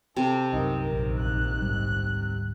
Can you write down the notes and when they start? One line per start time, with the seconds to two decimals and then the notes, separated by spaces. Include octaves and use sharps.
0.16 C3 A4
0.52 C2 F#2 D#4 A#4
0.81 A#1 D#3 A#4
1.19 F#6
1.61 D2 G#2 G3